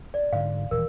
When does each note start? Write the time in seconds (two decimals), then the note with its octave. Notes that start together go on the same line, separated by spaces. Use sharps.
0.14 D5
0.33 G#2 D3 F5
0.71 D#1 E3 A#4